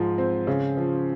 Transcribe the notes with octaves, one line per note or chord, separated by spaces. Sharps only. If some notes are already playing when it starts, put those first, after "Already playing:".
Already playing: G#2 F3
C4
C#3
F3